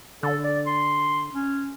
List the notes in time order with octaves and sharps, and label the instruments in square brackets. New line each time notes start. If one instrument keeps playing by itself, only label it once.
[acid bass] D3 [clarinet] A4
[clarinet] D5
C6
C#4